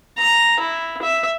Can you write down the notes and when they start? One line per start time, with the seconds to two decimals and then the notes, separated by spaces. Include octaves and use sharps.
0.17 A#5
0.60 E4
1.02 E5